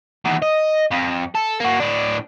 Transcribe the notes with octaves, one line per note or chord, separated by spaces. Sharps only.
E2 D#3
D#5
F2
A4
A#3 F#4
A2 D4